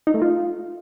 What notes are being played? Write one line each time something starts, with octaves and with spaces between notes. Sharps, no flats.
D#4
A3
F4